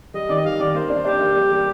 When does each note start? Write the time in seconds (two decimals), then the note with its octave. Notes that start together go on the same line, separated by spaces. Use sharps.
0.14 G3 D#5
0.29 D#3 D5
0.37 D#5
0.45 G3 F5
0.59 D#3 D5
0.74 A#3 C5
0.90 D4
1.05 D4 G4
1.20 A#3
1.36 G3
1.51 G3